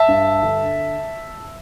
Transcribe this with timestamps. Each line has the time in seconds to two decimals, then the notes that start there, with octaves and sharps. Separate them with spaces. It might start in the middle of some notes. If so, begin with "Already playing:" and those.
Already playing: E5 A5
0.08 G2
0.43 D3